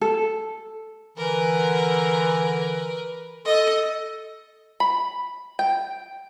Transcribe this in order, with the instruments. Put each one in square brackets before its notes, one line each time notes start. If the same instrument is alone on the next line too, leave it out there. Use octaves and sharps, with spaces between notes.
[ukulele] A4
[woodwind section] D3 E3 [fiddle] A#4 B4
[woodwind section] A4 [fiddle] D#5
[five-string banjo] B5
G5